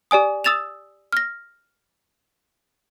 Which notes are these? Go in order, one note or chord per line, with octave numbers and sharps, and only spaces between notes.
G4 D5 G#5 D#6
D#6 E6 A6 E7 F7
F6 A#6